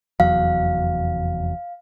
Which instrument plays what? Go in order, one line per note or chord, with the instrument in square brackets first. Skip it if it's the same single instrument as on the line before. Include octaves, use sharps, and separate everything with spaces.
[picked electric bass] F1 E2 F#3 [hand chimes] F5